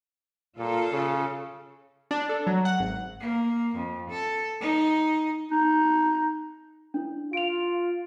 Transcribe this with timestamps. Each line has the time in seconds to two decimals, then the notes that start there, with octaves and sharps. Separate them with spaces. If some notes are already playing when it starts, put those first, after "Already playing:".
0.58 A#2 F4 A4
0.91 C#3
2.11 D4
2.29 A4
2.47 F#3
2.65 F#5
2.79 G#1
3.20 A#3
3.75 F2
4.10 A4
4.61 D#4
5.51 D#4
6.94 D4 E4
7.33 F4 D7 F7